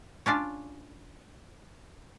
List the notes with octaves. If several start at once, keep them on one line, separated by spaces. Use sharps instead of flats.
C#4 D4 F4 D5